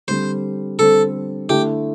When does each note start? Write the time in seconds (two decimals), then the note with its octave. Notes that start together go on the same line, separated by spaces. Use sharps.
0.08 D3 G3 C4 C5
0.79 D3 G3 C4 A4
1.49 D3 A3 E4 G4